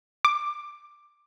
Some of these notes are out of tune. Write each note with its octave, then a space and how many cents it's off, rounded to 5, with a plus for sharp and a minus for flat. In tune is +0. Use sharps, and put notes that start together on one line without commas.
D6 +10